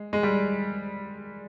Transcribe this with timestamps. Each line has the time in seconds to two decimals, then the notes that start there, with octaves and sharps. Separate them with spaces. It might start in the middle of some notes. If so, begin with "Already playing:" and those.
Already playing: G#3
0.13 G#3
0.23 G3